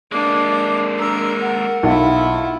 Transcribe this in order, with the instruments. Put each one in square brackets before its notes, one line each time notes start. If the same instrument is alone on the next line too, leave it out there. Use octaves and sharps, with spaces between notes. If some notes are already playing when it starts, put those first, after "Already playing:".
[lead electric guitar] G#3 A#3 [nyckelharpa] D4 [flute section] D6
[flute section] D4 A#5 E6 [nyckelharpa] A#4
[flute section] F#5
[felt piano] B1 [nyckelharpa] E4 F4